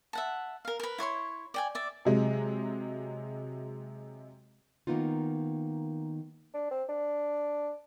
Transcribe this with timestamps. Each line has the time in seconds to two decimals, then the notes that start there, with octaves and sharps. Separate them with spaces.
0.13 E5 F#5 A5
0.65 A#4 F5
0.80 A#4 B4
0.98 E4 C#5 C6 C#6
1.54 D5 G5 G#5
1.75 D5 E5
2.05 C3 F#3 G#3
4.87 D#3 F#3 A#3 B3 D#4 F4
6.54 D4
6.71 C4
6.89 D4